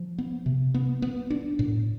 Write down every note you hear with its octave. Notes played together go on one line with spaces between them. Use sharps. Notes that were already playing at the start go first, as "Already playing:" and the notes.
Already playing: F3
B3
C3
B3
B3
D4
A2